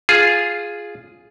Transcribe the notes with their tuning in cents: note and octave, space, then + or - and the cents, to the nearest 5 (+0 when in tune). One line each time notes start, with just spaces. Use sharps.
F4 +0 G#4 +0